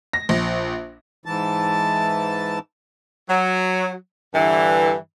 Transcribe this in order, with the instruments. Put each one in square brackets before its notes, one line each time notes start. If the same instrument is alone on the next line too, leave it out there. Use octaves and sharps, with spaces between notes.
[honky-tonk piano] A#6
A#1
[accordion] G#2 E3 A5
[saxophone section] F#3
G2 D3 E3